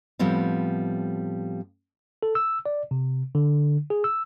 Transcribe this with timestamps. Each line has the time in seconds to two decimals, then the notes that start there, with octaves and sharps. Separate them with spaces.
0.19 A2 F3 G3 B3 C4
2.23 A4
2.35 E6
2.66 D5
2.91 C3
3.35 D3
3.90 G#4
4.04 E6